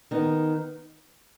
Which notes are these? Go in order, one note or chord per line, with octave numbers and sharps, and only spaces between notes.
D#3 B3 D#4